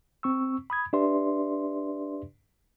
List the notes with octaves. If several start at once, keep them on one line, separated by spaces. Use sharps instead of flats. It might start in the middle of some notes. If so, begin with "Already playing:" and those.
C4 C#6 E6
B5 D#6 G#6
D4 G4 B4 D5 E5 C6